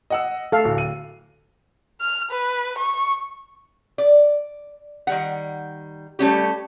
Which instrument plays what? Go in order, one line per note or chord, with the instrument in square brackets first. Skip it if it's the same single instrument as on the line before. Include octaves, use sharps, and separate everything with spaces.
[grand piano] D#5 F#5 E6
[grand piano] A3 [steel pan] A4 F5
[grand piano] D1
D#7
[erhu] F6
B4
C#6
[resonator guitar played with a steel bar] D5
D#3 G3 F#5
G3 A3 C#4 G4